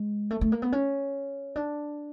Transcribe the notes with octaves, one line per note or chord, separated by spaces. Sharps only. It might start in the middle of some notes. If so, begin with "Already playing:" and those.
Already playing: G#3
A3
A3
A#3
B3
C#4
D4